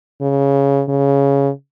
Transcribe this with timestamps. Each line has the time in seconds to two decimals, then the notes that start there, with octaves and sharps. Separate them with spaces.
0.22 C#3
0.89 C#3